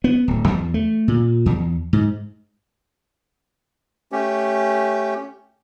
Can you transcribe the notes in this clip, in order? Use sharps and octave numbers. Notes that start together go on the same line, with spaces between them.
B3
D1
E2
A3
A#2
E2
G#2
A3 C#4 G4